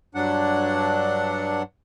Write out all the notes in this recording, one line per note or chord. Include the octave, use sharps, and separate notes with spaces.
G2 F#3 D4 F#5